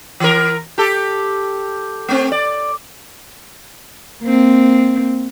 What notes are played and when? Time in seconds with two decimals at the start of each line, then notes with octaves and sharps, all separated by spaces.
0.20 E3 A#4
0.78 G4 A4
2.08 A3 C4
2.32 D5
4.22 A#3 C4